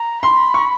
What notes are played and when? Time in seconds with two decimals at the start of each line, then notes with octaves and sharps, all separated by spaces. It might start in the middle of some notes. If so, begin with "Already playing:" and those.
Already playing: A#5
0.23 B5 C6
0.54 C#6